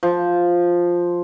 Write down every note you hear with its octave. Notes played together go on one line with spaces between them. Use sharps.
F3